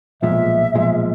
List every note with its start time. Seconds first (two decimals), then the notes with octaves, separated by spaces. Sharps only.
0.22 B1 A#2 F3 G#3 E5
0.74 B1 A#2 F3 G#3